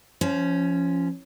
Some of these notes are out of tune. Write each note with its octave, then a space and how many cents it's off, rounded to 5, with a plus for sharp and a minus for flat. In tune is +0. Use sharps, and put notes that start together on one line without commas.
F3 -20 C#4 +0